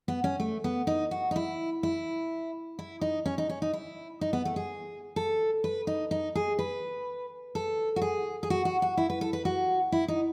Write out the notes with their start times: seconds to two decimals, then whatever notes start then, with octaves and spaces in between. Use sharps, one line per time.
0.08 B3
0.24 C#4
0.40 A3
0.64 B3
0.87 D#4
1.11 F#4
1.31 D#4
1.36 E4
1.83 E4
2.79 E4
3.01 D#4
3.26 C#4
3.38 D#4
3.49 C#4
3.62 D#4
3.73 E4
4.21 D#4
4.33 B3
4.45 A3
4.56 G#4
5.16 A4
5.64 B4
5.87 D#4
6.11 D#4
6.35 G#4
6.59 B4
7.55 A4
7.96 F#4
8.02 G#4
8.43 G#4
8.50 F#4
8.65 F#4
8.82 F#4
8.97 E4
9.10 B4
9.21 A4
9.33 B4
9.45 F#4
9.92 E4
10.08 D#4